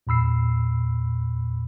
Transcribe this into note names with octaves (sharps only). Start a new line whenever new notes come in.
E2 A#2 B5 E6 C7